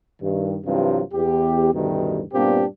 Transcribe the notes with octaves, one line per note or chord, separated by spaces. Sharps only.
G2 D#3
C2 G2 C3 E3 F#3 F4
E2 G4
A1 D2 G2 B2 D#3
G2 A#2 B3 C4 D4 G4